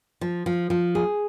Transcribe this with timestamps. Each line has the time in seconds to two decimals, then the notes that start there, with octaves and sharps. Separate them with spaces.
0.21 F3
0.46 F3
0.70 F3
0.95 G#4